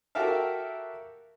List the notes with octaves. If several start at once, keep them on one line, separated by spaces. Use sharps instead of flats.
F#4 G4 A4 A#4 E5 F5